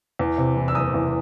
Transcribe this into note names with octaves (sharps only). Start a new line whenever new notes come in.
E2
C3
E3
E6
F#1 D#6
E2